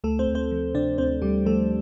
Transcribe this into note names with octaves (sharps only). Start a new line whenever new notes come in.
D2 A3 A4
C4 C5
D2
C4 C5
F3
C3 D4 D5
D2 C4 C5
D2 G3 G4
F3 A3 A4